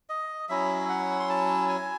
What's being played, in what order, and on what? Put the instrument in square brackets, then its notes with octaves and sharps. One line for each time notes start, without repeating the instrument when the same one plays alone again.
[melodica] D#5
F#3 C#4 E4 E5
F#5
C6
A5
G#5